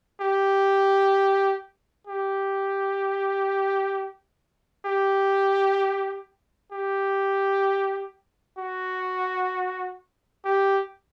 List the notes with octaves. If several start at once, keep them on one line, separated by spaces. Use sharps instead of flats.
G4
G4
G4
G4
F#4
G4